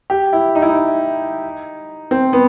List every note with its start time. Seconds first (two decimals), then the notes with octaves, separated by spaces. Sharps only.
0.10 G4
0.33 E4
0.55 D#4
0.62 E4
0.69 D#4
2.11 C4
2.33 B3